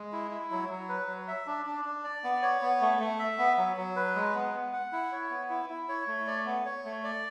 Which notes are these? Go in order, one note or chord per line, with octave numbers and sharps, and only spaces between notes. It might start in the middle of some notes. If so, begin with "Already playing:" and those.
Already playing: G#3
E4
E4
F#3
F#3
B4
F#3
E5
D4
D4
D4
D5
B3
C#5
B3
A3
A3
E5
B3
F#3
F#3
B4
G#3
B3
B3
F#5
E4
C#5
B3
E4
E4
C#5
A3
D5
B3
C#5
A3
D5